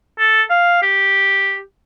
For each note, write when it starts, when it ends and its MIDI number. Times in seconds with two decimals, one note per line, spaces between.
0.19 0.43 69
0.50 0.82 77
0.82 1.61 67